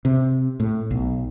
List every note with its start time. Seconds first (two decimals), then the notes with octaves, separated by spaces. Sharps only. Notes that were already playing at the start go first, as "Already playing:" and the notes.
0.05 C3
0.60 A2
0.91 B1